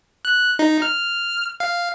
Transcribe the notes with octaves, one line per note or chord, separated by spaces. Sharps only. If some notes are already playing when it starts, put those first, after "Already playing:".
F#6
D#4
F6
F5